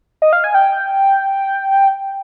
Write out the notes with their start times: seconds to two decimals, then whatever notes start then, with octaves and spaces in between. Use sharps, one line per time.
0.22 D#5
0.33 F5
0.44 G#5
0.54 G5